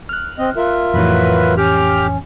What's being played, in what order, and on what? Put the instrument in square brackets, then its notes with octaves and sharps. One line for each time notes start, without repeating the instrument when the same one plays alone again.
[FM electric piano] F6 F#6
[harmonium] C4 D#5
F4 A#4 E5
[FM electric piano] F2 A2 E3 [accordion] F#3 B4
[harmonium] C#4 [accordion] G4 F6